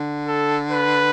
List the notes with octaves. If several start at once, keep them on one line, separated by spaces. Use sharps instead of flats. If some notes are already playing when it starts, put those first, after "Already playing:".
Already playing: D3
A4
B4